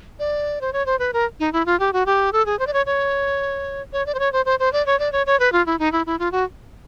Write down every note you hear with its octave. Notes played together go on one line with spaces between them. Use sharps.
D5
C5
C#5
C5
B4
A#4
D#4
E4
F4
G4
F#4
G4
A4
G#4
C5
D5
C#5
C#5
C#5
D5
C5
C#5
C5
C5
C5
D5
C#5
D5
C#5
C#5
B4
F4
E4
D#4
E4
E4
F4
F#4